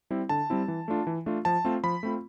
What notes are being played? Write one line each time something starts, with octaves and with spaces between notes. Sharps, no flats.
G3 C4 E4
D3 A5
G3 C4 E4
E3
A3 D4 F4
E3
A3 D4 F4
F3 A5
A3 C4 F4
F3 B5
A3 C4 F4